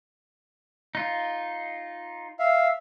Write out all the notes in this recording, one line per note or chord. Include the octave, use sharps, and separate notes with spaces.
D#4 F4
E5 F5